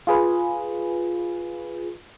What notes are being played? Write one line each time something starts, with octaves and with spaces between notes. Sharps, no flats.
F4 G#4 B4